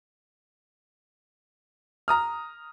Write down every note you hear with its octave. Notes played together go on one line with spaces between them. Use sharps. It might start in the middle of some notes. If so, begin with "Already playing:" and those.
A#5 D#6 F6